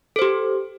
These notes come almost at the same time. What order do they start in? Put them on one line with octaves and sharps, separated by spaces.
A4 C5 G4